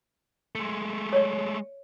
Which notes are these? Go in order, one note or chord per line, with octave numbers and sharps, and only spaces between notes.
G#3 A3
C#5 D5